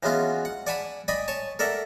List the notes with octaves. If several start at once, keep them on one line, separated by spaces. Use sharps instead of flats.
E3 F#3 G#3 B3 C#4 F4
F#5
D5 F#5 G#5 A5 B5
D5 D#5 G5 G#5 B5
C#5 G#5 A5
A4 A#4 D5 E5 F#5